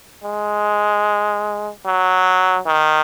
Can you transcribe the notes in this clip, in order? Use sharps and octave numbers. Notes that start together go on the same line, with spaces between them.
G#3
F#3
D#3